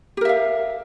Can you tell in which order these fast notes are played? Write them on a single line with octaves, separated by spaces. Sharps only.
G4 A#4 E5 F5